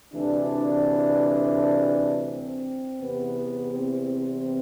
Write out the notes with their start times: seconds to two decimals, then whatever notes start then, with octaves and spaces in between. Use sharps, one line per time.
0.12 D2 C3 E3 D4
2.29 C4
3.01 E2 C3 E3 B3
3.73 C4